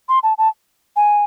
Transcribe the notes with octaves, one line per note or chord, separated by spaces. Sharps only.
C6
A5
A5
G#5